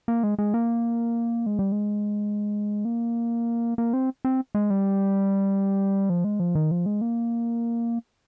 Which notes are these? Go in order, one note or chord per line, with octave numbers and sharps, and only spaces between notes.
A#3
G#3
G#3
A#3
G#3
G3
G#3
A#3
A#3
C4
C4
G#3
G3
F3
G#3
F3
D#3
F3
G#3
A#3